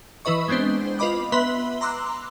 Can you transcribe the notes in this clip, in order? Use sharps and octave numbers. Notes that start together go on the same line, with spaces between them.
E3 E4 B4 D#5 C#6
G#3 B3 C4 D4 C5
F4 B4 D#5 B5 D6
B3 B4 E5 B5 C6 G7
A#5 C6 D6 E6 F#6